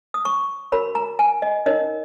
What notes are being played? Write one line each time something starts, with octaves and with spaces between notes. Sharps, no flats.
D#6
C#6
F#4 A#4 C#5 B5
A#5
G#5
D#5
D#4 A#4 C#5 D#5